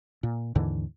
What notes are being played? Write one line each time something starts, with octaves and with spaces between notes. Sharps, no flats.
A#2
D#2 G#2 D3 E3